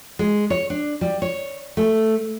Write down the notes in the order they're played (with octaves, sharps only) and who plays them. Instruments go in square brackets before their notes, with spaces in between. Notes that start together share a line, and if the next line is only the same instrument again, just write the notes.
[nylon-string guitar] G#3
C#5
D4
G3
C#5
A3